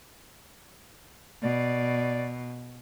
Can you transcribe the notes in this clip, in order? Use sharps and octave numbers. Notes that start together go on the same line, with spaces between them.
B2 D5